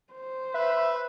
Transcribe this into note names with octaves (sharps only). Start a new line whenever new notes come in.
C5
B4 E5